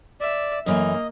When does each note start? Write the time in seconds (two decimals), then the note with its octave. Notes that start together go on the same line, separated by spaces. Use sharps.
0.20 D5 E5
0.66 F#2 E3 A3 A#3 D#5